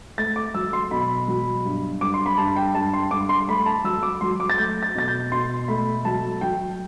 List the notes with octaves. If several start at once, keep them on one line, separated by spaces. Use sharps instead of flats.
A3 A6
D6
F#3 E6
C6
B2 B5
F#3
G2
G2 D6
C6
B5
G2 A5
G5
G2 A5
C6
G2 D6
C6
A3 B5
A5
F#3 E6
D6
F#3 C6
D6
A6
A3 G6
A6
B2 A6
G6
B2 C6
A3 B5
F#3 A5
F#3 G5